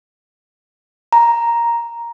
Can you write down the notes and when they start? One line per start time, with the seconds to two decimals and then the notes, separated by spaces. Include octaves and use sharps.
1.13 A#5